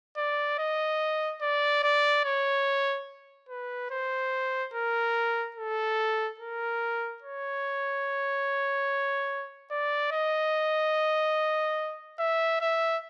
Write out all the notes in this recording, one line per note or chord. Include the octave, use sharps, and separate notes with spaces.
D5
D#5
D5
D5
C#5
B4
C5
A#4
A4
A#4
C#5
D5
D#5
E5
E5